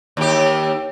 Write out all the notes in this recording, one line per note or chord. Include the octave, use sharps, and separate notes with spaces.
D#2 G4